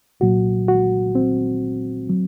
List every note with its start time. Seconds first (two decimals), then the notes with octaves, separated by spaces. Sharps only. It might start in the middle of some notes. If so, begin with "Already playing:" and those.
0.20 C2 A#2 F#3 F#4
0.68 F#4
1.15 C4
2.10 F#3